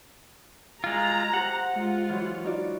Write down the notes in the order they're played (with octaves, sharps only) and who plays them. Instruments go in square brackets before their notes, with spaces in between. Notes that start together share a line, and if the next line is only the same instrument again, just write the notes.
[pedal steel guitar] G#3 F4 [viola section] A#5
[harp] G4 C5 [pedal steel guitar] F#5
[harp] G#3 [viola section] F4
[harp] E3 F#3
D#4 F#4 D5